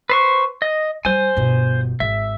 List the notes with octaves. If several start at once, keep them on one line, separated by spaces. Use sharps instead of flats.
B4 C5 C#6
D#5
G3 C5 G#5
G1 B2
G#1 E5